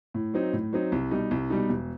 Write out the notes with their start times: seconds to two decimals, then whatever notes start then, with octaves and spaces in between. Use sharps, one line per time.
0.14 A2
0.34 F#3 C4 D#4
0.53 A2
0.73 F#3 C4 D#4
0.92 C2
1.11 B2 G3 D#4
1.31 C2
1.50 B2 G3 D#4
1.70 E1